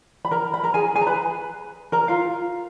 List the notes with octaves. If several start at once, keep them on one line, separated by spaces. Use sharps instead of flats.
B5
A#4 A#5
B5
A#4 A#5
G#4 G#5
G#4 G#5
A#5
B4 B5
A#4 A#5
F4 F5